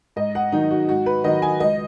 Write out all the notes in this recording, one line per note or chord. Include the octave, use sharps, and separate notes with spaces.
G#2 D#5
F#5
D#3 F#3 D#4
F#4
G#2 F#4
B4
D#3 F#3 D#5
G#5
C#2 D#5